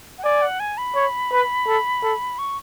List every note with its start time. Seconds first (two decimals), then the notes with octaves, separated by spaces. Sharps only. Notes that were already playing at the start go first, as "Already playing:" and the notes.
0.18 F#5
0.23 D5 G#5
0.42 F#5
0.60 G#5
0.77 B5
0.95 C#5
1.31 B4
1.67 A4
2.03 A4
2.38 C#6